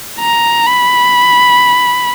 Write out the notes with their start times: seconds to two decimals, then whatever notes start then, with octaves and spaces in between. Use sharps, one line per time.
0.20 A#5
0.67 B5